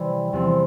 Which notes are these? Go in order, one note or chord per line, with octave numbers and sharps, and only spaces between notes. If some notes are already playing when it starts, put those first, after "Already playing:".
Already playing: C3 E3 G3 C4
E2 C3 F3 C4